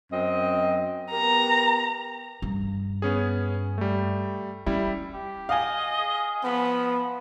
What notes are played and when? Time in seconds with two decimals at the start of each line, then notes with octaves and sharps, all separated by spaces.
0.10 F#2 C4 D#5
1.11 B3 G4 A#4 A#5
2.42 G2
3.02 B3 C#4 G#4
3.78 G3 A3
4.66 G3 C#4 E4
5.14 G4
5.49 D#5 F5 G#5
5.99 G#4
6.44 F3 B3 B5